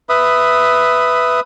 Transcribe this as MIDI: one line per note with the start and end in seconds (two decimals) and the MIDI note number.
0.09 1.40 71
0.09 1.40 76
0.09 1.40 87